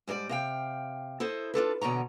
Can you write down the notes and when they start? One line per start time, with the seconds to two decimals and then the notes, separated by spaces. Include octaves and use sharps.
0.07 G#2 G3 A#4 D5
0.29 C3 F5 G5
1.20 E4 A4 C5 D#5
1.54 D4 F4 A4 B4
1.81 E2 B2 D3 C#5 A#5